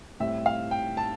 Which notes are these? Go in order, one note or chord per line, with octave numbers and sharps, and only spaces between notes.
A2 G3 C4 E5
F5
G5
A5